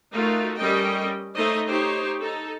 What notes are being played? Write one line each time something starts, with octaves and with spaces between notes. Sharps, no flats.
A3 D#4 F4 F#4 A#4 F5
G3 C#4 A4 A#4 D#5 G5
A3 D#4 C5 C#5 D#5
D#4 G4 C5 C#5
D#4 A4